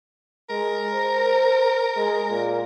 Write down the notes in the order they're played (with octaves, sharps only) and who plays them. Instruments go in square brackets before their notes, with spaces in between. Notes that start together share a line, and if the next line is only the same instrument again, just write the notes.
[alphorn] G#3 [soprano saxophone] A#4
[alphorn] C5
G#3
A#2